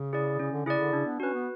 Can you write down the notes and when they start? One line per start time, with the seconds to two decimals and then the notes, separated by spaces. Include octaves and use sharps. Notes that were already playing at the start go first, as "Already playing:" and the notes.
Already playing: C#3
0.13 E4 G#4 D5
0.40 C#3 C#4
0.52 D3
0.65 C#3 E4 G#4 D5
0.79 D3
0.93 C#3 D4
1.05 B3
1.20 C#4 F#4 B4
1.33 B3